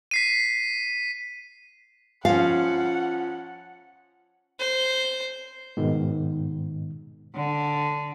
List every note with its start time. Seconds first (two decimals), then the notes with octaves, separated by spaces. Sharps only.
0.11 B6 C7 D#7
2.25 F3 C#4 F5 F#5
4.59 C5
5.77 G#2 B2 D#3
7.35 D3